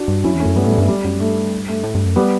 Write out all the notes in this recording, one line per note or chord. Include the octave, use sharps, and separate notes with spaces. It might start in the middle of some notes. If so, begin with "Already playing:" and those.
Already playing: D4 F#4
G2
F#2 C#4 E4
E2
A3 C#4
F#2
G2 G3 B3
A2 A3
G3
G2 A3
G3
F#2
G2 A3
A3
A2
G2
F#2
G3 B3